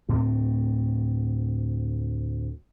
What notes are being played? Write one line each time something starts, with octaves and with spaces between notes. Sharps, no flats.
D2 A2 C4